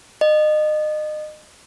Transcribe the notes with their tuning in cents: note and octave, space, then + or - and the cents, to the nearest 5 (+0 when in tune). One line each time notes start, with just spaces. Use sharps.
D#5 -30